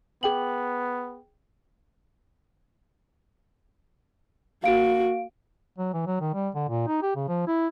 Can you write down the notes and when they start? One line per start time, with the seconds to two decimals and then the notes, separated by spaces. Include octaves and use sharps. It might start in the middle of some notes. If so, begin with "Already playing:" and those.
0.23 B3 G#4 G5 F#7
4.64 A#3 F#4 F5 D7
5.78 F#3
5.93 E3
6.07 F#3
6.21 D#3
6.34 G3
6.55 D3
6.69 A#2
6.87 D#4
7.02 G4
7.16 C#3
7.28 F3
7.47 E4